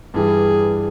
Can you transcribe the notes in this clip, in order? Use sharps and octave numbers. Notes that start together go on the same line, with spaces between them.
G2 E3 G3 G#4